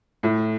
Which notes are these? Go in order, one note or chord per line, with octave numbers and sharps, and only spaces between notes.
A2